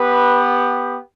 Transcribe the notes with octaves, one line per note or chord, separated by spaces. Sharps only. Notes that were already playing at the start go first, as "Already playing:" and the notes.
Already playing: B3 G4 B4